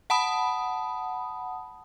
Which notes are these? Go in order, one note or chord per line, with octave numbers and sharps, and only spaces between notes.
F#5 A5 B5 D#6